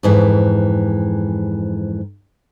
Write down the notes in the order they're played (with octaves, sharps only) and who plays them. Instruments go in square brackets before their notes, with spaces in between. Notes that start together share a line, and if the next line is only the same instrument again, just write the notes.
[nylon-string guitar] F2 G#2 E3